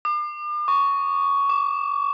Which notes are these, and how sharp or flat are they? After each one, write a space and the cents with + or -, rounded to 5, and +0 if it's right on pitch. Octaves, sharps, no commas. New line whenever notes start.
D6 +40
C#6 +10
D6 -15